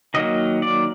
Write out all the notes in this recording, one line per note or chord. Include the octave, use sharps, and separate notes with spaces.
D#3 F#3 A#3 D#5
D5